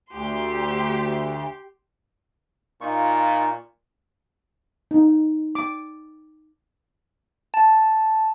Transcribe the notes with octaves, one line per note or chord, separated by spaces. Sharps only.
D2 G4 C6
A#2 D#4 F4 C#6
D#4
D6
A5